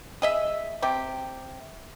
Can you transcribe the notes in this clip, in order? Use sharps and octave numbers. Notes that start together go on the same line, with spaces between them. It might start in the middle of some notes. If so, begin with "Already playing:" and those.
G#4 D#5 E5
C3 G4